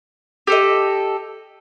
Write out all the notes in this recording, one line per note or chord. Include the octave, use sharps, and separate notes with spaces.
G4 A4 D#5